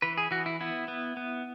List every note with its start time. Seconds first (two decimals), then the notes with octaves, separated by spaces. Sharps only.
0.02 E3 B4
0.18 G#4
0.31 E3 F#4
0.46 E4
0.61 B3 E4
0.88 B3
1.17 B3